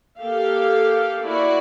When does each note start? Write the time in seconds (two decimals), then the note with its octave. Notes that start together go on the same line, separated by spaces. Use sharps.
0.19 A#3 G4 A4 F5
1.25 A#3 E4 F#4 D5